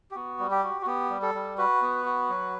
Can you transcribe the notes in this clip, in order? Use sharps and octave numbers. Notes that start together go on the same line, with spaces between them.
G4
B3 F#4
G3
G4
F#4
F#4
B3 G4
G3
A4
G3
F#4 B4
B3
F#4
F#3